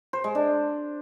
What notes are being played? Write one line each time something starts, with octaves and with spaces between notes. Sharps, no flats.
C5
G#3
D4